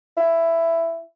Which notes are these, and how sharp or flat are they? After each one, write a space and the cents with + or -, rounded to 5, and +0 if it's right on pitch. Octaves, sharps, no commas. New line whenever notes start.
E4 +10